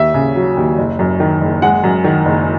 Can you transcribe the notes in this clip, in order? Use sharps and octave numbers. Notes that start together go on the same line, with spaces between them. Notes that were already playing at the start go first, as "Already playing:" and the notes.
Already playing: D#2 E5
C#3
F#3
D#2
F#1
F#2
D#3
F#1
G#3 F#5
F#2
D#3
F#1